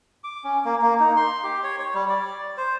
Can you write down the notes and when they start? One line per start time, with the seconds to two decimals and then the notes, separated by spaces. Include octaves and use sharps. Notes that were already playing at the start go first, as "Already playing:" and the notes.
0.24 D6
0.44 C#4
0.65 A#3
0.82 A#3
1.00 D#4
1.16 C6
1.44 G4
1.63 C#5
1.79 C#5
1.94 G3
2.09 D5
2.57 C5